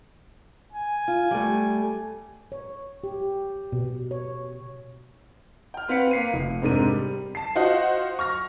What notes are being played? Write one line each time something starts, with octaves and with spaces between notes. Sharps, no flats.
G#5
F4
G3 A3
C#5
G4
B2
C#5
G5 F6
C4 B4 F5 F#5 B6 C#7
A#3 C7 D#7
F1
G#2 C3 D4 A#4 D#7
G3
A5 C7
F4 F#4 C5 D#5 F#5
C#6 F6 A#6